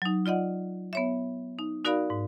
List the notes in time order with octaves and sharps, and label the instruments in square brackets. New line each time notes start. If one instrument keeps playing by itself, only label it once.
[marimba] F#3 D#4
F4 D5 D#5 F#5
B3 C#5 E5
D#4
D#4 F#4 A#4 D5 F5 B5
G#2